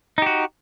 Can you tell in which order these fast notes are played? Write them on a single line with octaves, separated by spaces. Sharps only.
D#4 G4 F#4